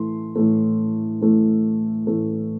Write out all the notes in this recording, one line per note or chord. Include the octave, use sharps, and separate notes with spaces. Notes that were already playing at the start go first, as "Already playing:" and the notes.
Already playing: A2 E3 A3 C6
A2 E3 A3
A2 E3 A3
A2 E3 A3